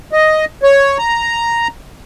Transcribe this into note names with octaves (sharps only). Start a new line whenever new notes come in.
D#5
C#5
A#5